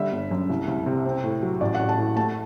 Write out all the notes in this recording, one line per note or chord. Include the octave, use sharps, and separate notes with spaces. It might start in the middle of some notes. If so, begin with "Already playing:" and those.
Already playing: D3 G3 E5
G1
F#2
C2
C2
C3
C4
A2
F#3
A1 D5
A1 F#5
A5
A2
A3 A5